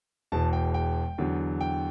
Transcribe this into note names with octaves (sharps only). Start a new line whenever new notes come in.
E1 E2 B2 A5
G5
G5
E2 D3 F#3
G5